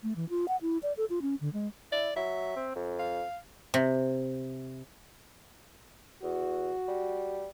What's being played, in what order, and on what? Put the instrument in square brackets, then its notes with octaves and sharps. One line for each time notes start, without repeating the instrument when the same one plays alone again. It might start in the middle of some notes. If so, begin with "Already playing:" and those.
[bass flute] A3
E3
F4
F#5
E4
D5
A4
F4
C#4
D3
G#3
[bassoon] E4 [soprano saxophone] D5
[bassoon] F#3 [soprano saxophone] E5
[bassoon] C4
F2
[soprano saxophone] F5
[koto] C3
[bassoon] E2 [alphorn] F#4
[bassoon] G3